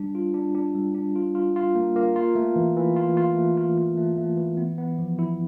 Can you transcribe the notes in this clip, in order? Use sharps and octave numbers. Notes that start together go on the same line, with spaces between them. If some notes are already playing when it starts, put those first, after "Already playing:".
Already playing: G3 D4
F4
D4
D4
G3
D4
F4
F4
F4
A#3
A#3
F4
A3
E3
E3
F4
F4
A3
F4
F4
A3
A3
E3
B3
B3
F3
E4